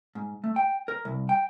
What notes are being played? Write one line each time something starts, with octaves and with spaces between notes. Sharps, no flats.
G#2
A3
G5
A#4
C2
G5